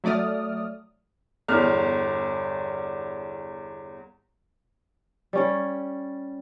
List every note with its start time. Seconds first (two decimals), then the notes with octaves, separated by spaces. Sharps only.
0.04 F#3 A3 D5 D#6 F6
1.48 G1 E2 F6
5.33 G3 C#4 C#5